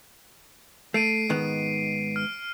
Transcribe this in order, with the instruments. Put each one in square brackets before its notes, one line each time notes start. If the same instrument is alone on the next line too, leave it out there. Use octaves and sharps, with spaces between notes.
[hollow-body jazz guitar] A3 [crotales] C7 D7 D#7
[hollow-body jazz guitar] G#2 D#3 B3
[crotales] F6